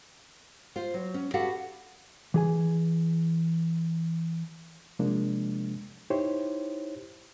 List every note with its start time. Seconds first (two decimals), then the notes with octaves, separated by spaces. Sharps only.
0.76 F4 C5
0.94 F#3
1.14 C#4
1.34 F#4 G4 A4 B4 F5 F#5
2.34 E3 G#4 G#5
4.99 C3 F3 G#3 A#3 D4
6.10 D#4 E4 G4 C5 C#5